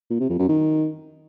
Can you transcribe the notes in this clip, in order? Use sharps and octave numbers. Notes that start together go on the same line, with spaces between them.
A#2
C3
F2
F#2
D#3